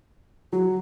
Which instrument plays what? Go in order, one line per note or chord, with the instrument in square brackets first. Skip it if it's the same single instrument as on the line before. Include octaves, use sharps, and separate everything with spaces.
[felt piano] F#3 [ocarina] F#4